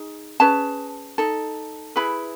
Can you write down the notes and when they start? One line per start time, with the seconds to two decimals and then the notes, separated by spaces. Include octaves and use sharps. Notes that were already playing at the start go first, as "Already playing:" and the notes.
Already playing: D#4 G#4
0.40 C#4 G#4 B4 A5
1.18 D#4 A4
1.96 E4 G#4 B4 B5